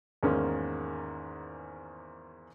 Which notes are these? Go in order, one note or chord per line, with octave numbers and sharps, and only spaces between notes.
E2 G#2 D#3 G#3 A#3 C#4